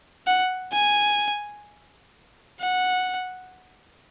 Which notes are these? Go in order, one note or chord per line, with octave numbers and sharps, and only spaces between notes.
F#5
G#5
F#5